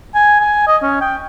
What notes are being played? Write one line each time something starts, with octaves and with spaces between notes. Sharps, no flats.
G#5
G#5
D#5
C#4
G5